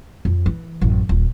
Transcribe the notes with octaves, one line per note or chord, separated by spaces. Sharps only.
F2
E3
A1 F#2
D#1